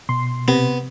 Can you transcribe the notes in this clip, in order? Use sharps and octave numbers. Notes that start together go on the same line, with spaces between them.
B2 C6
C3 B3